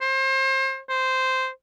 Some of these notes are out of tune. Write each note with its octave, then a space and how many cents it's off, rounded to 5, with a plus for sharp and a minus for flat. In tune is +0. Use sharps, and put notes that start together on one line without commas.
C5 +30
C5 -10